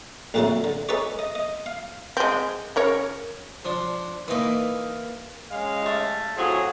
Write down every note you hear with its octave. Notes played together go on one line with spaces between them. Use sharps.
A1 F2 A#2 C#3 F#3 E4
D3
D#4 G#4 A4 B4 C#5 D5
D#5
D#5
F5
G#3 C4
C#3 A#4 C#5
F3 D4
E3 A#3 D#4 B4
G#3 C#4 F5
G3 A3
A2 F#3 C4 F4 G#4 C#6